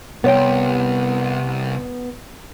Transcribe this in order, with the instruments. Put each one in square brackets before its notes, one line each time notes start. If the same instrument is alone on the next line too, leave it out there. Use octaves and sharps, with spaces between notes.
[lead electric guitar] C2 [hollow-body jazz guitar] B3 C#5 G5